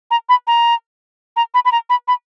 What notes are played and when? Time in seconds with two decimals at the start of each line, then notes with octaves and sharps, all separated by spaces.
0.11 A#5
0.29 B5
0.47 A#5
1.36 A#5
1.54 B5
1.65 B5
1.72 A#5
1.89 B5
2.08 B5